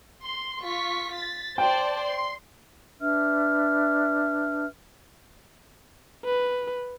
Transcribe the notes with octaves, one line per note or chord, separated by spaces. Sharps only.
C6
F4 C#6 B6
A6 B6
C5 D5 G5 A5
C6
D4 B4 E5 F6
B4